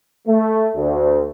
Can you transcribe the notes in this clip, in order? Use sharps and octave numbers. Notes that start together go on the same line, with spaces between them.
A3
D2